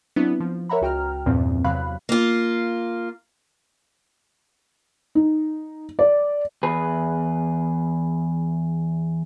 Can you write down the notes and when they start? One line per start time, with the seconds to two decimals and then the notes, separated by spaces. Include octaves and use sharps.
0.16 F#3 B3 C4 D4 E4
0.40 F3
0.69 A#4 C#5 E5 F#5 A#5 B5
0.82 C#2 F#4 G5 A#5 F6
1.26 E2 G2 A#2 F3 C4
1.64 E2 C3 F#3 F5 B5 F#6
2.09 A#3 F4
5.15 D#4
5.99 D5
6.63 E2 G#4 B4